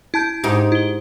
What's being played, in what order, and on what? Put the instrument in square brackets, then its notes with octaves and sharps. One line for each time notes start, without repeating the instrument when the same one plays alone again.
[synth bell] E4 A5 G6
[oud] G#2 D#4 G4
[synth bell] E4 G7